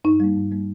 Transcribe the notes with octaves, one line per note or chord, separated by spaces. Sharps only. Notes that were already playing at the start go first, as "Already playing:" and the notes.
G2 D#4
G3 A#3
G2
G3 A#3